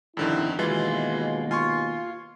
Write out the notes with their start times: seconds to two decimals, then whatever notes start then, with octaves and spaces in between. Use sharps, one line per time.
0.17 G1 C2 F2 D3 D#3 E4
0.59 D#2 B2 E3 G#3 F4
1.51 F4 G#5 C6 C#6